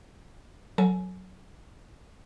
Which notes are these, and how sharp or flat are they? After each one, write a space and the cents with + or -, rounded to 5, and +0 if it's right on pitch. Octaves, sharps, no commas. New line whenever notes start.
F#3 -5 A4 +5 G#5 +25